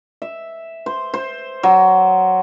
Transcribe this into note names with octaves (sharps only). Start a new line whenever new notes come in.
E5
C5
C5
F#3